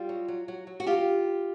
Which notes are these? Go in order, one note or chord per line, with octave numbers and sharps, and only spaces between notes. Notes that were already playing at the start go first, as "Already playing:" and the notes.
Already playing: G3 F4
F#3
F#3
F#3
F#3
F#4
C3 F4 G4